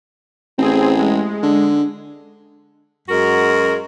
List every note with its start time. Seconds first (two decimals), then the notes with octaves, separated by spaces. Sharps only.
0.58 A1 C4 G#4
0.99 G#3
1.43 D3
3.09 F#2 G#3 F#4 A#4